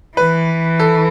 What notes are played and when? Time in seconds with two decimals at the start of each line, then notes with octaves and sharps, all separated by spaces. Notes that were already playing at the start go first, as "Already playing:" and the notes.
0.17 E3 B4
0.79 A4